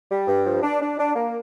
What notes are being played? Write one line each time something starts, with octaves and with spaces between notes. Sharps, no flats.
G3
G2
F3
D4
D4
D4
A#3